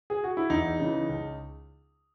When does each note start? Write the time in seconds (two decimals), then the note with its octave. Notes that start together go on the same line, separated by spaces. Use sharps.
0.10 G#4
0.24 F#4
0.37 E4
0.50 E2 D#4
0.80 C#3 E3
1.09 C#2